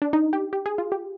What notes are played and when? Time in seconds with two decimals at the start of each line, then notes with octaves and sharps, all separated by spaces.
0.02 D4
0.13 D#4
0.33 G4
0.53 G4
0.66 G#4
0.78 F4
0.92 G4